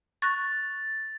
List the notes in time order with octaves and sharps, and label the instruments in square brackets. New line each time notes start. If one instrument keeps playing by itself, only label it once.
[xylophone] C#6 F#6 A#6 [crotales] A6